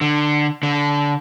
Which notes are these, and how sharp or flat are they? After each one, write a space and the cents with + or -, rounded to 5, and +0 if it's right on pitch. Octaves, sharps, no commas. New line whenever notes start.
D3 +15
D3 -20